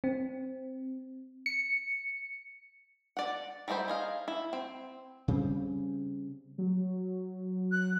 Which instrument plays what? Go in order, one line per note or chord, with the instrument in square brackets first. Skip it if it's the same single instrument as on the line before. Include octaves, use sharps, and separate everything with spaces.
[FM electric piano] C4
C#7
[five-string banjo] D5 F#5
G3 D#4 E4 G#4 C5
G#4 D#5 F5
E4
C4
[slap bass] C#3 G3 C4
[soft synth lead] F#3
[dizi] F#6